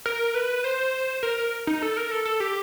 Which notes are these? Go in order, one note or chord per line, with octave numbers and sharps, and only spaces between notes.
A#4
B4
C5
A#4
A#4
D#4
A4
A#4
A4
A4
G4